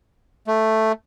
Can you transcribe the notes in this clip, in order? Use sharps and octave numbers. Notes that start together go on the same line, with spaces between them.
A3